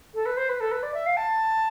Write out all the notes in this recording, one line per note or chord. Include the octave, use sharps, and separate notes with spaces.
A4
B4
C5
B4
A4
B4
D5
E5
F5
A5